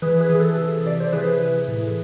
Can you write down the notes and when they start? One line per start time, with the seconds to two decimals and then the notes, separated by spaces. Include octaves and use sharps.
0.02 E3 G#4 B4
0.21 G#4 B4
0.29 E3
0.35 G#4
0.40 A4
0.57 C3
0.86 C3 D5
1.00 C5
1.13 E3 G#4 B4
1.40 E3
1.68 A2